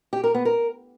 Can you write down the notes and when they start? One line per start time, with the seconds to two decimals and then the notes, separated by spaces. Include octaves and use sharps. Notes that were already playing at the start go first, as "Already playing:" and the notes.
0.13 G4
0.24 A#4
0.34 B3
0.45 A#4